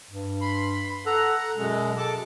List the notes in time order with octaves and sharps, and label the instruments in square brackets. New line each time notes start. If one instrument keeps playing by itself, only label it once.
[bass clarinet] G2
[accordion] B5 C6
[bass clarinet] A4 [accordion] F#5 A#5
[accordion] F#2 G#3 [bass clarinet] B2
[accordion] A4 A5 D6